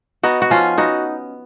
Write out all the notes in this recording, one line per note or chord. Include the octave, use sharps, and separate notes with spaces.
B3 D#4 F#4
F#4
F3 C#4 F4
B3 D#4 F#4